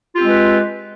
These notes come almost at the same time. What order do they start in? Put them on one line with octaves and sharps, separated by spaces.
F4 G4 C4 G#3 B4